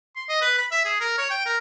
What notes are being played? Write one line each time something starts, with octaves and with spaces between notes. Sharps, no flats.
C6
D#5
B4
B5
E5
G#4
A#4
C#5
G5
A#4